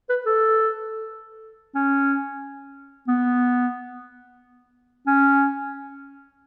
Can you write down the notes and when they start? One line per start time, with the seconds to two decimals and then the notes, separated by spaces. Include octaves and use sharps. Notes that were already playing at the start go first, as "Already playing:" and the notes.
0.10 B4
0.26 A4
1.75 C#4
3.08 B3
5.07 C#4